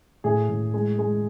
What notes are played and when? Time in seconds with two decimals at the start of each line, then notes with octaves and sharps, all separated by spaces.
0.24 A2 G#4
0.49 A2
0.74 G#3
0.99 G#3